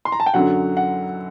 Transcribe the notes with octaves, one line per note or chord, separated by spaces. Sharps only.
C6
A#5
A5
G5
F#2 D3 F#3 F#5
F#5